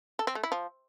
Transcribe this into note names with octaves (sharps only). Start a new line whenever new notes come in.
A4
C4
A3
E4
F3